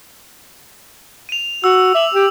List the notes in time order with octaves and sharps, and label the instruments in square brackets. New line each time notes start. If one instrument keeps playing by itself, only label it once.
[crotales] D#7 F7
[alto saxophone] F#4 [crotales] E6
[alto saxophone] E5 [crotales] D6 F#7
[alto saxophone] G4